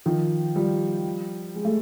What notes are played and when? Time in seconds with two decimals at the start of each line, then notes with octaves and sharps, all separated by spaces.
0.06 D#3 F3
0.56 F3 G3
1.56 G#3
1.65 A3